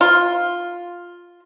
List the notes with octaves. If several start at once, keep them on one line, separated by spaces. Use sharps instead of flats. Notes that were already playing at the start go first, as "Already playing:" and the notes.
F4